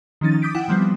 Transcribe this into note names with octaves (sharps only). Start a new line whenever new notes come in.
D#3 F3 C#4 D#4 A6
D6 D#6 G6 B6 D7
E4 F#5 G5
D#3 F3 G3 B3 C4